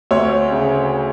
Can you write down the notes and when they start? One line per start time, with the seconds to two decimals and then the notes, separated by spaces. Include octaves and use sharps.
0.11 D2 C#5
0.51 C#3